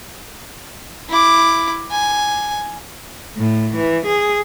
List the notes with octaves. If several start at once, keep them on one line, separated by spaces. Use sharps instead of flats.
E4 D6
G#5
A2
E3
G#4